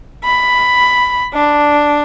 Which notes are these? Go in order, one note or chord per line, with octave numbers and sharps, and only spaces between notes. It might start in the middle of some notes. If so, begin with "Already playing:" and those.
B5
D4